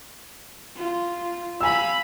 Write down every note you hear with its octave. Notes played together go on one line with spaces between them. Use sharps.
F4
F5 G#5 B5 E6